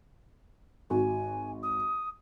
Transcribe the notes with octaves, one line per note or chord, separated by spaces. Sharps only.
G#1 F#4 G#5
D#6